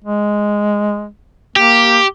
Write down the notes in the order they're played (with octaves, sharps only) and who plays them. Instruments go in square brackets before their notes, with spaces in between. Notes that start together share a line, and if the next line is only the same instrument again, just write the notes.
[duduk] G#3
[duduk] A#3 [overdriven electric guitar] G4